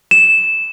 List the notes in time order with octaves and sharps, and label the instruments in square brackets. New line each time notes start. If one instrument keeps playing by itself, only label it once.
[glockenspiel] E7